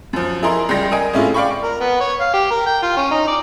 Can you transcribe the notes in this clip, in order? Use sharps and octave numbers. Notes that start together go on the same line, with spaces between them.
F#2 F3
E4 G#4 A#4 D#5 A#5 C6
C#2 G3 G5 C6 A#6
A#4 D#5 G#5
A2 C3 G#3 C#4 E4 F4
D5 F5 G5 B5 C#6
A#4
B3
C#5
F5
G4
A#4
G5
F4
C#4
D#4
D5